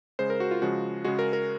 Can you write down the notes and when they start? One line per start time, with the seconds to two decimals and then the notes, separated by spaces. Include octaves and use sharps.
0.19 C#3 G#3 C5
0.30 A#4
0.40 F#4
0.51 F4
0.62 C#3 F3 G#3 F#4
1.04 C#3 G#3 F#4
1.19 A#4
1.33 A#4